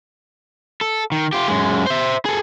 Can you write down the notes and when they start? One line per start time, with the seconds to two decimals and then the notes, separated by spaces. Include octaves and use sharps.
0.81 A4
1.12 D#3
1.33 F4 G4
1.48 F#2 G#3
1.86 C5 E5
2.25 G#4 A4